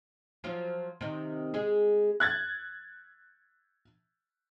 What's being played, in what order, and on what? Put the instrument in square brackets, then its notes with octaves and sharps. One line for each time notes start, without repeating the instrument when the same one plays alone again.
[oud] F3 F#3 F4
C3 D#3
G#3 G#4
[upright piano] F#6 G#6 A6